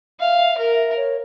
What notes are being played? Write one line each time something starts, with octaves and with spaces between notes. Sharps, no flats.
E5 F5
A#4
C#5